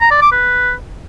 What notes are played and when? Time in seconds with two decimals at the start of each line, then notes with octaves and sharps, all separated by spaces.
0.01 A#5
0.11 D5
0.21 D6
0.32 B4